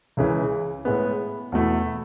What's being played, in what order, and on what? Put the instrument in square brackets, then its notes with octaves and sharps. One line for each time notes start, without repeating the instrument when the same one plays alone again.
[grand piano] C#2 C#3 E3
A2 G#3 B3
E2 B2 A3 E4